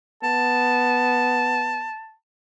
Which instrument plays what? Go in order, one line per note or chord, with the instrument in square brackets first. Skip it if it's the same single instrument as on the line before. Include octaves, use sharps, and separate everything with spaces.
[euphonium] B3 [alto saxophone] A5